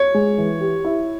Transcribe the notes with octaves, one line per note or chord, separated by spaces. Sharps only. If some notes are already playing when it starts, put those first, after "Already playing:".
Already playing: C#5
G#3
E3
G4
E4